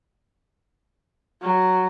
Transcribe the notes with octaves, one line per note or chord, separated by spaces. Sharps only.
F#3